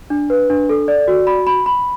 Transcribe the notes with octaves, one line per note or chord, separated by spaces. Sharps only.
D4
B4
D4
A4
D5
F#4
B5
B5
B5